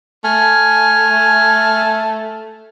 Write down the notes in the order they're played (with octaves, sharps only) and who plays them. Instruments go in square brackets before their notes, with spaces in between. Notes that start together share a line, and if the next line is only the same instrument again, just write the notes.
[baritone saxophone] A3 [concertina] G#5 F6